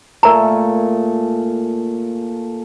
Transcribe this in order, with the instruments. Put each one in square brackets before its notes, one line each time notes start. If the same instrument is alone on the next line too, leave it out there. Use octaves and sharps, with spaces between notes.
[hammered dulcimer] A#2 A3 G#5 [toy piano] A#4 A#5